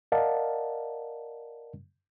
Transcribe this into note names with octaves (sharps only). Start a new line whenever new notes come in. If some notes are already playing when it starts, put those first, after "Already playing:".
A#4 D5 D#5 F5 F#5 A5